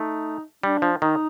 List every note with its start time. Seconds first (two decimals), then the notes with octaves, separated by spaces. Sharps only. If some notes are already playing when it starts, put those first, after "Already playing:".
Already playing: A3 D#4
0.63 G3 D4
0.82 F3
1.02 D#3 D#4